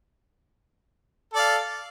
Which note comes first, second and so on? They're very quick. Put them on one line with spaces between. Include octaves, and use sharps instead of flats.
A4 D5 F5